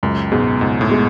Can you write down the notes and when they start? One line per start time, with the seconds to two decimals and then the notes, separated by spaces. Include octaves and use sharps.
0.03 C#2 F#2
0.31 G#2 B2 G#3
0.61 C#2 G#2
0.81 A2
0.89 B2 G#3